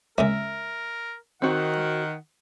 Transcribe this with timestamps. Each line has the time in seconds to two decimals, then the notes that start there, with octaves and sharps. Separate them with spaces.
0.18 C#3 G#3 A#3 A#4 E5
1.42 D#3 C4 F#4 F#5